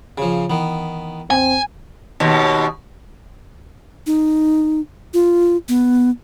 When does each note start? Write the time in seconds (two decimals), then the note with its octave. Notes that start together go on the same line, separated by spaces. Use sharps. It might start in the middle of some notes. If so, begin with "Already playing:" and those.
0.18 C#3 F3 G#5
0.50 D#3 E3 B3
1.31 A1 E2 C4 G#5
2.20 D#2 B2
4.06 D#4
5.14 F4
5.68 B3